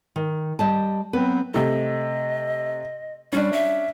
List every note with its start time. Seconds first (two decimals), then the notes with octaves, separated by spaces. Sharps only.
0.16 D#3
0.59 G3 D#5 A5
1.13 F#3 B3 C4 B4
1.54 C3 A3 D#5
3.33 G3 C#4 D4
3.53 E5